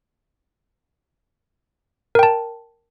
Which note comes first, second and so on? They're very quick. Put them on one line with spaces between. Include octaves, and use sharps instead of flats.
A#4 G5 A5